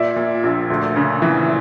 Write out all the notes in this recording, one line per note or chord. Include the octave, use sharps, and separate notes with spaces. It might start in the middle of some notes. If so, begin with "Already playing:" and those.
Already playing: A#2 D5 E5
A#2
A#1
D2
C#3
E3